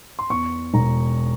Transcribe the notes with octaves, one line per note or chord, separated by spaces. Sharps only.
C6
E2 C#6
E1 A#5